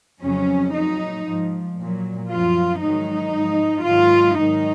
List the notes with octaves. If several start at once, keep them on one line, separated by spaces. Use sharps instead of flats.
F2 C#3 F#3 C#4
A#2 F#3 D#4
G#2 F3
A#2 F#3
F#2 F3 F4
G#2 D#3 F#3 D#4
G#2 F3
G#2 D#3 F#3 F4
G#2 D#3 F#3 D#4